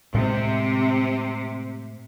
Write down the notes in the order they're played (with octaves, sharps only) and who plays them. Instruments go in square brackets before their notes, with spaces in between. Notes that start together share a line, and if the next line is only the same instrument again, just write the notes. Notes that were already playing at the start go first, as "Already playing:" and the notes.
[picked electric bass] A2 G#3 [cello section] C3